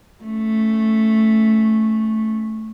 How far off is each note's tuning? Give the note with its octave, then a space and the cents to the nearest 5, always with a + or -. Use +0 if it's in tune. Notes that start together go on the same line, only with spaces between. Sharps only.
A3 +0 C#4 +0